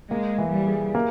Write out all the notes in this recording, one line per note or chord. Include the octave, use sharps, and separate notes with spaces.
G#3 A#3
E3
G3
G#4
A#3